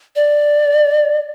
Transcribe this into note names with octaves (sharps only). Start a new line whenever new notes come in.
D5